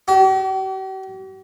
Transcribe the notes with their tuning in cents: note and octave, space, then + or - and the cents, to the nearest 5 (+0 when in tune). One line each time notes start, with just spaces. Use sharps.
G4 -45